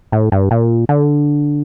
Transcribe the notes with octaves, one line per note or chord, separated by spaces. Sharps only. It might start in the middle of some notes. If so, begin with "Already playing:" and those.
A2
G2
A#2
D3